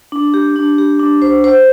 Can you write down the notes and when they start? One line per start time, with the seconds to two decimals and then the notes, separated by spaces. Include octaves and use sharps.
0.12 D4
0.34 G4
0.56 D4
0.78 G4
1.00 D4
1.22 C5
1.44 C5